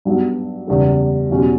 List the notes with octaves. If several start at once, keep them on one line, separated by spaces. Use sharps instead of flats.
G2 F#3 B3
F#1 E2 C#3 G3
E2 B2 F#3 C#4 G4